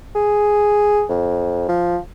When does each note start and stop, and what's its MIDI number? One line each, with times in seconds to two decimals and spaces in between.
0.15 1.04 68
1.09 1.65 41
1.69 1.98 53